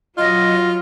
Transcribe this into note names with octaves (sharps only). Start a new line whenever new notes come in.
F#3 F4 D#5